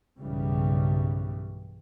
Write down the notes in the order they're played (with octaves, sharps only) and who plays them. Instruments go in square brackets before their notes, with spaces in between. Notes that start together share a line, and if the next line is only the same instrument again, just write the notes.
[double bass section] B1 G2 C#3 E3 G3